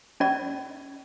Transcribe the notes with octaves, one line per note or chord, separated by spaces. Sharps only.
C#4 D5